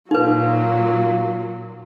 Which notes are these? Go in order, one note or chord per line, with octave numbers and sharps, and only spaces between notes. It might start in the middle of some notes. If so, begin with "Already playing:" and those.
A#2 F#3 D#4 F4 B4